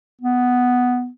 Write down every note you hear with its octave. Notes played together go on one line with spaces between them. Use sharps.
B3